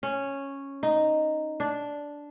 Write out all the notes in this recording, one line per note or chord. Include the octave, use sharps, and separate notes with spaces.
C#4
D#4
D4